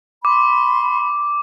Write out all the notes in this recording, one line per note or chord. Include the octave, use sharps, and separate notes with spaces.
B5 C6 D6